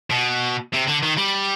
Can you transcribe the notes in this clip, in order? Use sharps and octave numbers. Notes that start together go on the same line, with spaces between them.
B2
C3
D3
D#3
G3